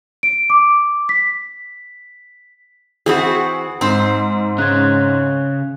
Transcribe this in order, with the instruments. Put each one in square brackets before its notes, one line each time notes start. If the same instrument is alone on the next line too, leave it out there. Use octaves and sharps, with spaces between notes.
[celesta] D7
D6
B6
[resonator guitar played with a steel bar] E3 C4 F#4 [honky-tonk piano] G#4 F#5 [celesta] B5 D#6
[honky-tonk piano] G#2 [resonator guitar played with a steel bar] C4 C5
[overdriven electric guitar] C#3 C#4 [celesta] F#6 G#6